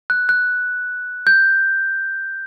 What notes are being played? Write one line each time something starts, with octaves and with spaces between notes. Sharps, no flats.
F#6
F#6
G6